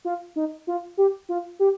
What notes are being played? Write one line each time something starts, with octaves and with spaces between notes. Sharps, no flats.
F4
D#4
F4
G4
F4
G4